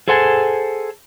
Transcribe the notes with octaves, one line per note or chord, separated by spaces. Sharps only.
G#4 A4 C5 F#5 G#5 A5